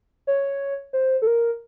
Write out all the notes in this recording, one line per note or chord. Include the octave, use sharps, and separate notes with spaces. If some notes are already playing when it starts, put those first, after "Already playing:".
C#5
C5
A4
A#4